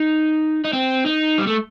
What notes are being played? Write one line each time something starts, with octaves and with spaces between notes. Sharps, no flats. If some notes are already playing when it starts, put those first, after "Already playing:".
Already playing: D#4
D#4
C4
D#4
G3
A3